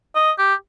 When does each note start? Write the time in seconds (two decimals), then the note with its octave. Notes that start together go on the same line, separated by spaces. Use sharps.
0.16 D#5
0.38 G4